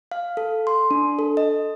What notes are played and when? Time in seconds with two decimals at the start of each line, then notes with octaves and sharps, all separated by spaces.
0.12 F5
0.37 A4
0.67 C6
0.91 D4
1.19 A4
1.37 D#5